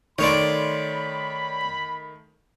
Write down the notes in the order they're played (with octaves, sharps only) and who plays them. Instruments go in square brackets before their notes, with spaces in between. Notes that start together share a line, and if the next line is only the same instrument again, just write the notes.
[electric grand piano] D#3 A3 C6 [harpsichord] C#5 D5 [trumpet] B5